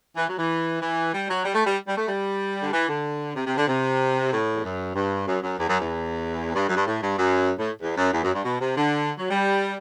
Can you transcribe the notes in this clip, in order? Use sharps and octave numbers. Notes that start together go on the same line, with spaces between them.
E3
F#3
E3
E3
G3
F#3
G3
A3
G3
G3
A3
G3
D3
E3
D3
C3
C3
D3
C3
A2
E2
F#2
G2
F#2
F#2
E2
F#2
E2
G2
F#2
G2
A2
G2
F#2
A2
E2
F#2
E2
F#2
G2
B2
C3
D3
F#3
G3